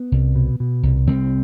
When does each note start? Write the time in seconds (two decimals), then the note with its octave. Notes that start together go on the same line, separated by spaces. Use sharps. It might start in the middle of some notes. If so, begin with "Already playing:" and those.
Already playing: B3
0.12 C2
0.35 B2
0.60 B2
0.83 C2
1.07 C2 C4